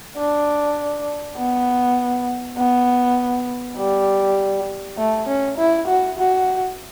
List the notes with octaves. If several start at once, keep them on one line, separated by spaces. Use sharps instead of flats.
D4
B3
B3
G3
A3
C#4
E4
F#4
F#4